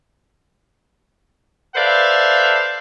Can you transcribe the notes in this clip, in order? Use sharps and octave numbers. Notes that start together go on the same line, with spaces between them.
A4 B4 C5 D5 E5 F5